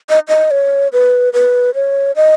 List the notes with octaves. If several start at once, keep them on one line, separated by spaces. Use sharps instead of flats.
D#5
D#5
C#5
B4
B4
C#5
D#5